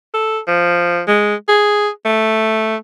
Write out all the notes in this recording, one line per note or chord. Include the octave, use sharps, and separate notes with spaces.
A4
F3
G#3
G#4
A3